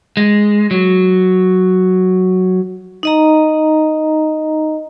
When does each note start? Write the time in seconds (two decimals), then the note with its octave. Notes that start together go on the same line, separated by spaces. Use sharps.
0.17 G#3
0.71 F#3
3.03 D#4 D#5 A#5